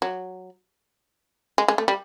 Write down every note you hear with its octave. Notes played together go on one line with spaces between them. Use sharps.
F#3
G#3
G#3
A3
G3